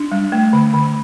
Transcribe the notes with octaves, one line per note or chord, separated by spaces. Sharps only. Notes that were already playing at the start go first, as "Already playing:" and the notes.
Already playing: D4
G3
A3
D3
D3